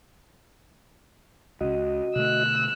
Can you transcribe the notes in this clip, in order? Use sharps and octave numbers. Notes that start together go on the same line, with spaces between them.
C#2 C#3 F#4 D#5
B2 D3 A3 E6 F#6